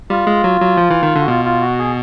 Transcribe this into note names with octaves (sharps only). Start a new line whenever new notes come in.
G3 F4
G#3
F#3
F#3
F3
E3
D#3
D3
F#4
B2 F4
F4
F#4
G#4